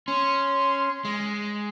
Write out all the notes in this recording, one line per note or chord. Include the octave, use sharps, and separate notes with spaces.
C#4 C6
G#3